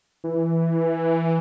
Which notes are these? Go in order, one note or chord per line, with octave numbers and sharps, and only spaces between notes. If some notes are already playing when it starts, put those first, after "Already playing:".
E3